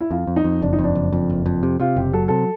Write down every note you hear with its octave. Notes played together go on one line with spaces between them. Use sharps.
E4
F2 F4
F2
D#4
F2
F#1 D4
D#4
F2
D4
F#1
F2
F#1
F2
C3
C3 F4
F#1 G4
F#3 A4
C3 A4